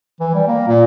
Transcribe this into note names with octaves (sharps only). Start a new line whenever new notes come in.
E3
G3
A#3
A#2